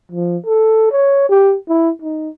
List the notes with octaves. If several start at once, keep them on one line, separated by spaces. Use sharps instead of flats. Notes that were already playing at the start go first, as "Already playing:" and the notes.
F3
A4
C#5
G4
E4
D#4